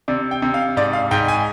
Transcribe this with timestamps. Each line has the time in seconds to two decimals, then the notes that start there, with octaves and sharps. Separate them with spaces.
0.08 C3 D5
0.31 G5
0.42 C3
0.54 F5
0.77 G#2 D5
0.93 F5
1.11 G#2 G5
1.28 G#5